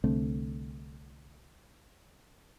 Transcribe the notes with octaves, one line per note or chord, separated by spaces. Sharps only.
C2 D3 A3 C4